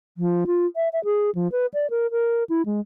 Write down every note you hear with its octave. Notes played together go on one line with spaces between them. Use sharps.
F3
F4
E5
E5
G#4
F3
B4
D5
A#4
A#4
E4
G#3